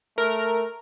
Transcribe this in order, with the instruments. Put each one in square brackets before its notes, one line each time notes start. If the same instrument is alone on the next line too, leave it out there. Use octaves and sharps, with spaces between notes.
[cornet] A3 [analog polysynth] A#4